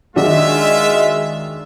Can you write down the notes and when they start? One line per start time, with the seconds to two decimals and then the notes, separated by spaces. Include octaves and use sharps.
0.16 D#3 G#3 D4 F4 F#4 E5